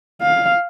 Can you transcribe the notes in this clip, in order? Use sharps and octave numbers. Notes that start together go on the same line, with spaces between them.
F5